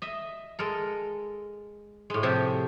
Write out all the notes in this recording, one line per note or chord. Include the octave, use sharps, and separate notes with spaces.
D#5 E5
G#3 A4 A#4
A2 G#3
C3 F3 G4 A4 E5